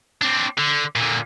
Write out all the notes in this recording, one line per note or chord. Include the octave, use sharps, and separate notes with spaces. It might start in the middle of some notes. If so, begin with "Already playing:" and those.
C4 D4
D3
A#2 D3